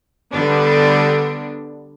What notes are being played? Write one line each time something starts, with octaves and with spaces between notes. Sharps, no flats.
D3 G3 B3 D4